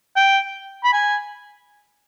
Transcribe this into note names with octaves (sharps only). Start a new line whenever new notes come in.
G5
B5
G#5